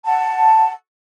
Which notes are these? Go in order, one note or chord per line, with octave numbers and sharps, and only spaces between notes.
F#5 A5